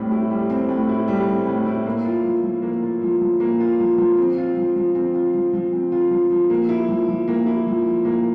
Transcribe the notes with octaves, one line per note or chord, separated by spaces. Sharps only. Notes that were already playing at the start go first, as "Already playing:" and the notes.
Already playing: A2 G3 C4
E4
G3
C4
A2
E4
G3
C4
A2
E4
A#3
F4
F3
F3
A#3
F4
F3
F3
A#3
F4
F3
F3
C4
F4
F3
F3
C4
F4
F3
F3
C4
F4
F3
F3
A#3
E4
F3
F3
A#3
E4
F3
F3
A#3